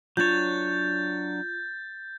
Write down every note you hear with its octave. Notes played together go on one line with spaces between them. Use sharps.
F#3 D4 F4 C#5 G6 A6